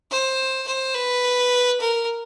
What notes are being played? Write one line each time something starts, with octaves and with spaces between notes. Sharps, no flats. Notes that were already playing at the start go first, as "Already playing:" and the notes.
C5
C5
B4
A#4